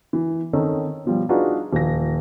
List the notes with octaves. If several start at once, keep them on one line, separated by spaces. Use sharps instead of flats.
E3
D#3 C4 C#4 D#4 A4
B2 F3 G3
D4 D#4 F4 F#4 G#4 B4
D#1 F3 A#6